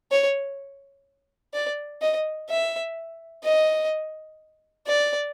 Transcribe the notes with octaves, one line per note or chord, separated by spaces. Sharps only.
C#5
D5
D#5
E5
D#5
D5